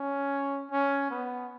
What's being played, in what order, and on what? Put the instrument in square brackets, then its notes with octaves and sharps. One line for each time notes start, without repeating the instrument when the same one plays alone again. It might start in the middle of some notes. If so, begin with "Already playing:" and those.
Already playing: [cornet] C#4
C#4
B3